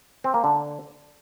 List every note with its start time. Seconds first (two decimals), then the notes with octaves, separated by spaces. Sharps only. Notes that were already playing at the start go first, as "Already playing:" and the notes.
0.24 C4
0.34 A#3
0.44 D3